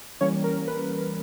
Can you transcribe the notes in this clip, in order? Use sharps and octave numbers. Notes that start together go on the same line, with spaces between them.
E3 G3 A#3 C#4 C#5
A#4
B4